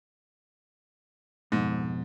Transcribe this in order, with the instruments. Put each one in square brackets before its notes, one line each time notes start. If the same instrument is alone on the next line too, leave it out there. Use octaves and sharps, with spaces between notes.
[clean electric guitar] F2 B2 [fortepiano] G#2